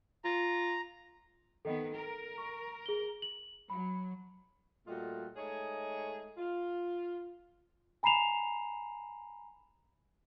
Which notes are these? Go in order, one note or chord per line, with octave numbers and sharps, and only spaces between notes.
F4 A#5
D#3 B3 A4 D#5
A#4
C#6
G#4 G7
F#7
F#3 B5
A#2 G3 A3 F4 F#4 D#5
G#3 A3 D#4 G#4 C#5
F4
G#5 A#5 B5 C7 E7 F7